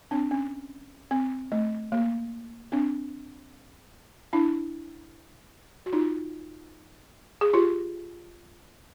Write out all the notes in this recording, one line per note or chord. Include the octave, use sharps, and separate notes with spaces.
C4 D4
C#4
C4
A3
A#3
C4 D4
D4 E4
F#4
D#4 F4
G#4
F4 G4